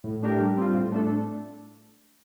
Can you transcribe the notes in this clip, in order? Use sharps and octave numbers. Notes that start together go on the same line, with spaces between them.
A2
A3 D4 G4 A#4
G3
C4 F4
A2
A3 D4 A4